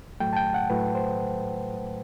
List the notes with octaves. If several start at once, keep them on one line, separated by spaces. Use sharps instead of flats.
A2 F#3 A3 G5
A5
G5
F#5
A2 F#3 A3 B4
C5